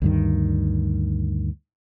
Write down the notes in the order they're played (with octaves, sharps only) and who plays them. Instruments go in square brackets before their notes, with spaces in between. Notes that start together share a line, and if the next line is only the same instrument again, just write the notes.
[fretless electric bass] D2 G2 D#3